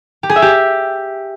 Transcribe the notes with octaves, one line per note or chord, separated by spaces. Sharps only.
G4
G#4
E5
G4